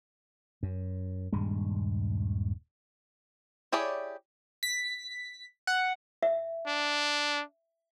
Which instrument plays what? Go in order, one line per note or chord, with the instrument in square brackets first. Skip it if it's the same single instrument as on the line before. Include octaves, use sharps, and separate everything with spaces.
[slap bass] F#2
D#1 G2 G#3
[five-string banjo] E4 G4 G#4 C#5 D5
[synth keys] B6
F#5
[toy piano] E5
[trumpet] D4